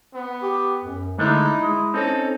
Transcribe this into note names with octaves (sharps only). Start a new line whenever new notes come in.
B3
G4
F#2
D3 G#3 A3 D#4 E4
G#3
C4 C#4 D#4 A4